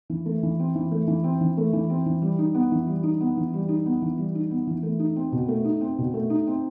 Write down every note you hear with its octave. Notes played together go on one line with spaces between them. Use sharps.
E3
A3
E3
C4
E3
A3
E3
C4
E3
A3
E3
C4
E3
G3
D#4
B3
E3
G3
D#4
B3
E3
G3
D#4
B3
E3
G3
D#4
B3
E3
A3
D#4
C4
B2
A3
D#4
C4
B2
A3
D#4
C4